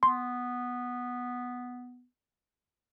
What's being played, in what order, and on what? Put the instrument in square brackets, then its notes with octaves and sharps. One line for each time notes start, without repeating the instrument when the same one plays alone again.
[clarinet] B3 [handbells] C6